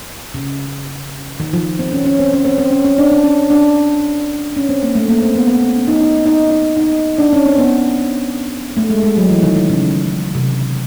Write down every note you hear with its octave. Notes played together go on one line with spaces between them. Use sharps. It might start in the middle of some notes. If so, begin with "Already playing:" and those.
C#3
D#3
F3
C4
C#4
C#4
C4
C#4
C4
C4
C#4
C#4
D4
D4
C#4
D4
C#4
C4
A#3
A3
A#3
C4
B3
B3
C4
C#4
D#4
D#4
D#4
D#4
D#4
D4
C#4
C4
B3
A3
G#3
G#3
F#3
E3
D#3
D#3
C#3
C3